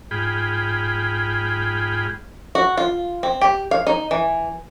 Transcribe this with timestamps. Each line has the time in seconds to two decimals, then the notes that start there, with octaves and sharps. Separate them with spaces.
0.11 G#2 F4 G#4 G5 B5
2.55 F#4
2.77 F4
3.23 C4
3.41 G4
3.71 F5
3.87 D#4
4.11 E3